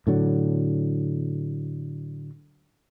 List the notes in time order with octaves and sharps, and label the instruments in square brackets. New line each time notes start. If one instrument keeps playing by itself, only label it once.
[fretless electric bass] A2 D3 F#3